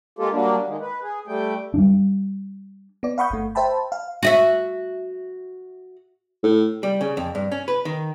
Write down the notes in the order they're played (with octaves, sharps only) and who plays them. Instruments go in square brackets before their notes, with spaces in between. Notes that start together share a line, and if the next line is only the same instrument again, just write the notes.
[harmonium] G#3 A#3 F4 G4 A4
F#3 G3 A#3 D4
D#3 G#3
B4
G#4
G3 A3 G5
[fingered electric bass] G3 B3 D4
[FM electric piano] B3 D5
F5 F#5 B5 C#6 D#6 G6
G1 A3
C5 E5 G5 A5 B5
F5
[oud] F#4 D#5 E5
[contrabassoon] A2
[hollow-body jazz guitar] G3
C#3
F2
G2
C#4
B4
D#3